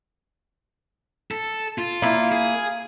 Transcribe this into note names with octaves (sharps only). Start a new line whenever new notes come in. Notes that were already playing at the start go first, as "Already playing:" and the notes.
A4
F4
A#3 E4
G#4